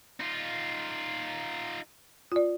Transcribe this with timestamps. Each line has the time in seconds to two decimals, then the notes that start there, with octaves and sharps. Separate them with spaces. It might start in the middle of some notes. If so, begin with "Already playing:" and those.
0.20 D#4 F4
2.32 F4 D5